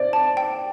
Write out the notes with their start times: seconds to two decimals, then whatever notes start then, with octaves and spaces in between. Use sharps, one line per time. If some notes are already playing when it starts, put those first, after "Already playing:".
Already playing: C5 D5
0.13 A5
0.37 G5